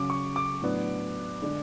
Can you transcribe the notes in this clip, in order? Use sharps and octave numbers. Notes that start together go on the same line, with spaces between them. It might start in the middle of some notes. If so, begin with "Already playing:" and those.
Already playing: C#3 F#3 C#4 D6
C#6
D6
A2 F#3 B3 D4
D3 G#3 D4